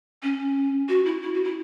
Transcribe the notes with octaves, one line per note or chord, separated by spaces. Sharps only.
C#4
F#4
E4
E4
F#4
E4